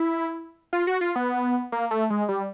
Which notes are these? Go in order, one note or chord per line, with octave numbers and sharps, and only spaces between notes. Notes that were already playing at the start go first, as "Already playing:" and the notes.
Already playing: E4
F4
F#4
F4
B3
A#3
A3
G#3
G3